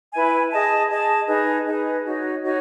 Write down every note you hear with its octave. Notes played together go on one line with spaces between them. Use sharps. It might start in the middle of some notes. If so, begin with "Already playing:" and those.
E4 B4 E5 G#5
G#4 D#5 A5
G#4 D#5 A5
D#4 G#4 B4
D#4 G#4 B4
D#4 F#4 C#5
D#4 F#4 C#5